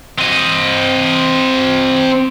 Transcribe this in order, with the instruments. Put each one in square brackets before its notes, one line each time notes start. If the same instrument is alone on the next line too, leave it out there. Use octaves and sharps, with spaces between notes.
[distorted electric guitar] C4 D#5